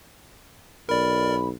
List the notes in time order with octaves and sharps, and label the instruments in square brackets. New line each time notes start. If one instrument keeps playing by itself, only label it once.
[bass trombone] B1 [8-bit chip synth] A#4 D5 [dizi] B5